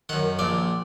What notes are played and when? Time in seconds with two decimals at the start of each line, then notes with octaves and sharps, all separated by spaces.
0.09 F#2 D#3 F#5
0.39 A#1 A#2 D5